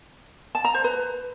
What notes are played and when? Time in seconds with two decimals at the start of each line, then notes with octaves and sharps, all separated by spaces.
0.55 A5
0.65 A#5
0.74 C5
0.84 B4